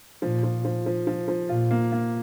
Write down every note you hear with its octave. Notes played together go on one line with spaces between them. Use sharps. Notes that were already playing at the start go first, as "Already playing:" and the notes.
A#2 F3
F3
F3
F3
F3
F3
A#2 F4
A#3
A#3